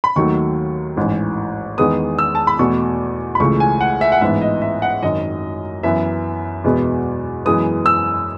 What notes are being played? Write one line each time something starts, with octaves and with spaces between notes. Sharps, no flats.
B5
D#2 D#3 F#3 A3 C#6
A1 G#2 E3
E2 D#3 G#3 B3 D#6
E6
A5
B5
E2 B2 A3 C#6
B5
C#2 C#3 E3 A3 C#6
G#5
F#5
E5
F#5
A1 G#2 E3 B3 E5
D#5
E5
F#5
G#1 F#2 D#3 F#3 D#5
F#2 E3 B3 E5
E2 B2 G#3 B3
F#2 E3 G#3 B3 D#6
E6